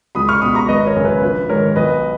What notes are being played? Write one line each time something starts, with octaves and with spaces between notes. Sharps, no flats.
C#2 B5 D#6
C#6 F6
B2 B5 D#6
A#5 C#6
G#1 B4 D#5
A#4 C#5
F#2 C#3
B4
A#1 B4
G#2 D#3 A#4 C#5
B1 B4 D#5